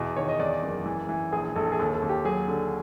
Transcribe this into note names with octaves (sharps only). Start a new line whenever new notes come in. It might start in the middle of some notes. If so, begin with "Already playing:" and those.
Already playing: E2 B2
D#3 C#5
D#5
E2 D5
F#1
E3
E3
A#1 G#4
A#1 A4
G#4
D#2 A4
A4
D#2
G4
F#3 G#4
D3